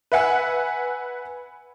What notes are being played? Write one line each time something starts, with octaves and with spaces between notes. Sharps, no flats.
B4 E5 F#5 G#5